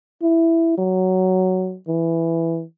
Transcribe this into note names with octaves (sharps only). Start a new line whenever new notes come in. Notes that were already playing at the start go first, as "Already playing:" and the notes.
E4
F#3
E3